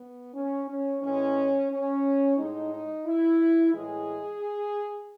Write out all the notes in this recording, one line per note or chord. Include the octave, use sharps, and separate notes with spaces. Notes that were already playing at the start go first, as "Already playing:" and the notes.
Already playing: B3
C#4
C#4
A2 E3 G#3 C#4
C#4
A2 G#3 D#4
D#4
E4
A2 E3 G#3 G#4